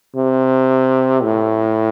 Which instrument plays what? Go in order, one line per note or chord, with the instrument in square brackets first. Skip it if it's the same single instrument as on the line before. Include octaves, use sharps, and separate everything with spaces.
[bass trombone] C3
A2